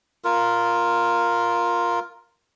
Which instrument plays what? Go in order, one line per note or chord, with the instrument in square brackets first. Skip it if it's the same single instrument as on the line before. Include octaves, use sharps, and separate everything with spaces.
[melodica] F4 A#4